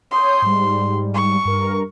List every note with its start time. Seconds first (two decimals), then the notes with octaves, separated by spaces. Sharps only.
0.11 C#5 C6 D#6 G6
0.42 G#2 G3
1.14 C#6
1.45 G2 A#4